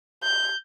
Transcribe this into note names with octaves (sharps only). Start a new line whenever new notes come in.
G6